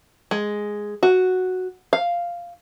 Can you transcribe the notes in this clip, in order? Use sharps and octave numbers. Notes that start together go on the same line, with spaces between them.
G#3
F#4
F5